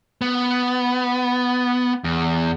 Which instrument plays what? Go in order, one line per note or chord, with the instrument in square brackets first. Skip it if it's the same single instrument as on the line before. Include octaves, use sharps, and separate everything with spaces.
[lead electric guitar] B3
E2